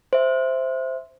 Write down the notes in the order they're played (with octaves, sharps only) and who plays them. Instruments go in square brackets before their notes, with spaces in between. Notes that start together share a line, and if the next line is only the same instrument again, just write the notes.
[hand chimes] C5 E5